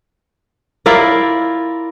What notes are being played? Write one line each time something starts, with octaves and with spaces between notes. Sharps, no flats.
E4 F4 A#4 D5